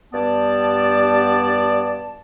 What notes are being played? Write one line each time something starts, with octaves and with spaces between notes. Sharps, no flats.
G2 B3 D5 A5